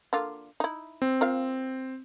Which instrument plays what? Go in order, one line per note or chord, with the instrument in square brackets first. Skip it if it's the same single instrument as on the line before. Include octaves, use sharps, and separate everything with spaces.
[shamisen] D3 A#3 F4
D#4 E4
[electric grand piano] C4
[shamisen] A#3 F4 F5